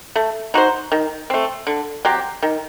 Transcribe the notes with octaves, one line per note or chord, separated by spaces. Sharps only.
A3
D#4 F#4 C5
D#3
A3 C4
D3
F#3 C4 G4
D#3